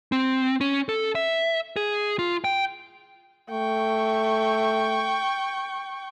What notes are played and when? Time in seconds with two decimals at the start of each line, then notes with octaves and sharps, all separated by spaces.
0.12 C4
0.61 C#4
0.89 A4
1.15 E5
1.76 G#4
2.19 F4
2.44 G5
3.51 A3 G5 C#6